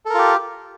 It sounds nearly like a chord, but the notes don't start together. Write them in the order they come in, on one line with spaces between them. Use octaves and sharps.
A4 A#4 F4 G4